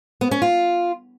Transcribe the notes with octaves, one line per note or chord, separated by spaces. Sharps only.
B3
C#4
F4